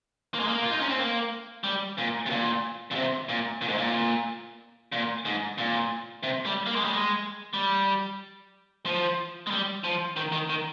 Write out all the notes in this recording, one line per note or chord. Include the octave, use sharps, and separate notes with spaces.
A#3
G#3
A#3
F4
D#4
C#4
C4
A#3
G3
A#2
C3
A#2
A#2
C3
A#2
A#2
G#2
A#2
A#2
G#2
A#2
C3
G3
A#3
G#3
G3
G#3
G3
F3
G#3
G3
F3
D#3
D#3
D#3